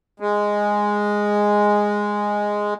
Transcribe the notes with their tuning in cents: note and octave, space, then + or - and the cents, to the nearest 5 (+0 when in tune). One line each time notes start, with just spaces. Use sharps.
G#3 -5